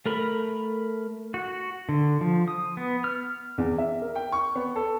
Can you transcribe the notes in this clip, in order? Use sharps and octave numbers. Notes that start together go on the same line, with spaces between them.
A3 A#4 B5
F#4
D3
F3
D#6
B3
F6
E2
E5
A#4
G5
C#6
B3
A4